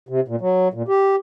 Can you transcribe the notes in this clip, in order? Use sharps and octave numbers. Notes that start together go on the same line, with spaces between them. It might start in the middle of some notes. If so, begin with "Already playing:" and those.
C3
A#2
F#3
A#2
G4